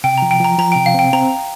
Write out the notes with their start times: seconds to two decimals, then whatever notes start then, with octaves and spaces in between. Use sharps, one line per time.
0.04 C3 G5
0.18 F3 A#5
0.31 G5
0.40 F3 A#5
0.59 F3 A#5
0.72 C3 G5
0.86 F5
0.94 C4 G5
1.13 C4 A#5